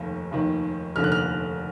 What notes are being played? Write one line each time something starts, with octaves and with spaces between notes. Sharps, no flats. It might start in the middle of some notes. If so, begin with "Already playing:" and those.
Already playing: F1 D#2 D#3
F1 D#2 D#3
F1 D#2 D3 F6
F#6
F6